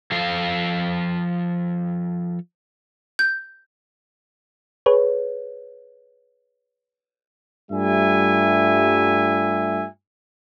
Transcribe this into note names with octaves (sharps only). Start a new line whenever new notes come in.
F3 A4 F5
G6
G#4 B4 C#5
G2 G3 A3 F4 E5 G#5